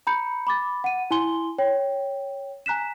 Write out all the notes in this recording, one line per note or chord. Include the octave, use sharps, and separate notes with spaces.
A#5 B5 G6 C#7
B5 D6 A6
F#5 D#7
E4 G#5 C6 G7
C#5 G5
G#5 A#5 F#6 B6 E7